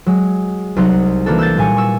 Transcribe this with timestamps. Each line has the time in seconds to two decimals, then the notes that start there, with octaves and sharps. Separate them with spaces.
0.06 F#3 G#3
0.76 C2 F#3 D#4 C5 F#5
1.26 E3 G3 A#3 D4 F#4 A4
1.39 E6 F#6 G6 A6
1.57 A#2 G3 G#5 C#6 C#7
1.77 C#6 E6